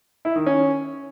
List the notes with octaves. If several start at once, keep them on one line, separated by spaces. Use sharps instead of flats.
E4
D#3
C#4